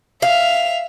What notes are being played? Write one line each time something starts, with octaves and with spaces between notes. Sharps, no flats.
E5 F5 F7